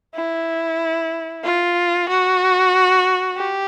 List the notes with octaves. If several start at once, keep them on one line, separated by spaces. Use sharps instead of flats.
E4
F4
F#4
G4